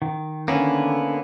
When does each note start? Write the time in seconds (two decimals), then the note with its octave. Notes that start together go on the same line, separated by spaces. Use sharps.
0.02 D#3
0.48 D3 A#3 B3 C#4 E4